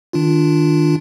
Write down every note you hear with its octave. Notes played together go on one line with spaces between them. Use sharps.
D#3 D4 F4